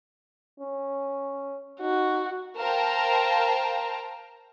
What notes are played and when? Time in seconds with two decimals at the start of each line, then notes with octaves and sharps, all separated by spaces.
0.60 C#4
1.80 D#4 F#4
2.57 A#4 C5 F5 G5 A5 A#5